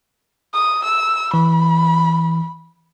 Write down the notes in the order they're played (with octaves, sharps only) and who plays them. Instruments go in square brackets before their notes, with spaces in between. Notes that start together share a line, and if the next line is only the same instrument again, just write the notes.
[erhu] D#6
E6
[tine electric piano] E3 [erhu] B5